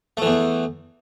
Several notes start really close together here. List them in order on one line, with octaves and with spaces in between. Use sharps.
A3 E3 E2